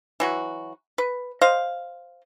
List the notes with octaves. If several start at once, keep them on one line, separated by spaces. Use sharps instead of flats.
E3 F#3 F#4
B4
C5 D#5 F5